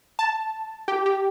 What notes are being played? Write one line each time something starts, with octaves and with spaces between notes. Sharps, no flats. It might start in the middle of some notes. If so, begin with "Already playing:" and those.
A5
G4
G4